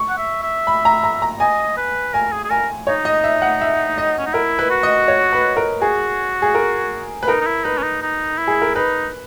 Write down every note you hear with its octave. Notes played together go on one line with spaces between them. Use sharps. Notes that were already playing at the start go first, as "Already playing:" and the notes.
Already playing: C#6
F#5
E5
E5
B5
A#5
A#5
A#5
D#5 G#5
B4
A#4 G#5
G#4
G#4
A#4 G#5
D#4 C#5
D#5
E5
F#5
E5
D#5
C#4
D#4
E4 A#4
B4
F#4
D#5
C#5
B4
A#4
F#4 G#4
G#4
A#4
B4
D#4 A#4
D#4
E4
D#4 B4
C#4
D#4
D#4
E4
G#4
A#4
D#4 B4